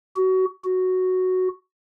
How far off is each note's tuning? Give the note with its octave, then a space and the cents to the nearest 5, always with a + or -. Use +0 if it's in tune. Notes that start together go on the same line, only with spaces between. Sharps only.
F#4 +25
F#4 +0